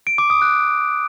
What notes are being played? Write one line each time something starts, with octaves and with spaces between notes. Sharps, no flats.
D7
D6
D#6
F#6